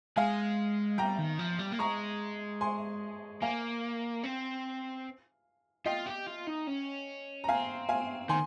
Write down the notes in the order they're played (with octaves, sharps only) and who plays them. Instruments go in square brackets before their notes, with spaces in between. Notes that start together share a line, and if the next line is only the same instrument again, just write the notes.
[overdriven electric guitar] G#3 [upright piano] F5 G#5
[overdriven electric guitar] G3 [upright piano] G5 A#5
[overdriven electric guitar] D#3
F3
G3
A#3
[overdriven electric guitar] G#3 [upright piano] A#5 C#6
[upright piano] G#5 C6
[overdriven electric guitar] A#3 [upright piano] F5 G#5
[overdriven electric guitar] C4
[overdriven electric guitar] F4 [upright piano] D#5 G5
[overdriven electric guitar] G4
F4
D#4
C#4
[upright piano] A#5
[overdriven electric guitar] C4 [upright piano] F5 G#5
[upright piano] F5 G#5
[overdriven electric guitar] D#3 [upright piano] G#5 C6